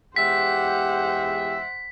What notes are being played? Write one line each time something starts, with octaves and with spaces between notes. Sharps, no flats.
E2 G#3 G4 C5 E5 F#5 B6